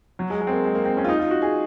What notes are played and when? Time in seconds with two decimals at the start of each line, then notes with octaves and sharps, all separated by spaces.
0.19 F#3
0.30 G#3
0.41 G#3
0.47 C4
0.53 A#3
0.64 G#3
0.75 A#3
0.85 C4
0.97 C#4
1.04 F4
1.09 D#4
1.19 F4
1.31 F#4
1.42 G#4